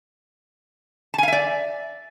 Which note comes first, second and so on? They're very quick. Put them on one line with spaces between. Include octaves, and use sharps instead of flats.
A5 G#5 F5 E5 D5